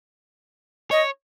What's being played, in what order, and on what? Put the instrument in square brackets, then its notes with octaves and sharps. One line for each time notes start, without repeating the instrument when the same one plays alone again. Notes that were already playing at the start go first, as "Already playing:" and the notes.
[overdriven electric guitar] C#5 [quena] D#5